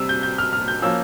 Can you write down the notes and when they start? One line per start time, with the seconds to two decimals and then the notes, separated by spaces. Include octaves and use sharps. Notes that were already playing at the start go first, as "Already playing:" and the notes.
Already playing: C3 G3 C4 E6
0.09 G6
0.23 G6
0.38 F6
0.53 F6
0.68 G6
0.82 F3 A#3 C#4 E6